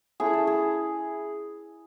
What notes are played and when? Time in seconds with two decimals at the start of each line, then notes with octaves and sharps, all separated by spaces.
0.20 A3 C#4 E4 G#4
0.33 A4
0.47 G#4